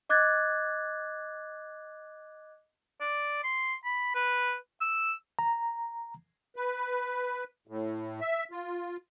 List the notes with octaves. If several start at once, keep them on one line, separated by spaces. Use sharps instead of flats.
D#5 D6 F#6 G#6 A6
D5
C6
B5
B4
E6
A#5
B4
A2
E5
F4